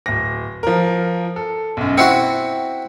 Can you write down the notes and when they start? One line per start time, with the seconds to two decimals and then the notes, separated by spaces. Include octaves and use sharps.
0.06 D1 A#6
0.63 F3 A#4
1.36 A4
1.77 B1 F#2
1.98 C4 E4 F#4 C#7